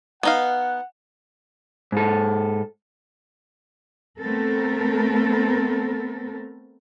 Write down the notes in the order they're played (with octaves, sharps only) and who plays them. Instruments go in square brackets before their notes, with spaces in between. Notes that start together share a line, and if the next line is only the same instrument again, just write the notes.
[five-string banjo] B3 D#4 F5 [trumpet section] F#5
[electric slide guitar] G#2 A4
[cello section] A3 B3 C4 A4 A#4